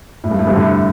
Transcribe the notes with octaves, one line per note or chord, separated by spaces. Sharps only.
A2
G2
A2
G2 C3
A2 D3